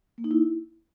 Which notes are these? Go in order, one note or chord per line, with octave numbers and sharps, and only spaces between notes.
A#3
D#4
E4